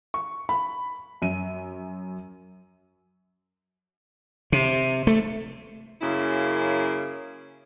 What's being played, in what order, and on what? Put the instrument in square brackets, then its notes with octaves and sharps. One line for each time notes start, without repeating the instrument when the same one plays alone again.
[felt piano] C#6
B5
F#2 D#7
[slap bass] C3
A3
[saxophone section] F#2 C#3 A#3 E4